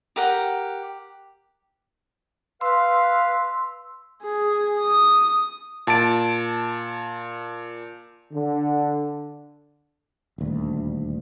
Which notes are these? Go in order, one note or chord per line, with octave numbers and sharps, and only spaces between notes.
G4 A#4 F#5 G5
B4 F5 C6 E6
G#4
D#6
A#2 A5 A6 D7
D3
D#1 D2